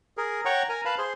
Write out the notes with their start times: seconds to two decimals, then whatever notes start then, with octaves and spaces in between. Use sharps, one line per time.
0.17 G#4 A#4
0.45 C#5 F#5 G5 A#5 C#6
0.69 A#4 G#5 A#5
0.85 B4 F5 A5 B5
0.98 G#4 C5 C6